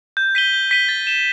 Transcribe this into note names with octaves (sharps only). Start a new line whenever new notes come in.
G6
B6 D#7 G7
G6
B6 D#7 G7
A6
E7 G7